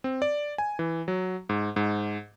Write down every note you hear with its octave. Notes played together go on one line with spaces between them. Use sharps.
C4
D5
G#5
E3
F#3
G#2
G#2